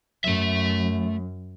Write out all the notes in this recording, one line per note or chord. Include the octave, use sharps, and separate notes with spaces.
F#2 A3 E5